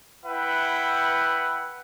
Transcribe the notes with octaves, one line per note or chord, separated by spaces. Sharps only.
E4 B4 E5 F#5 G5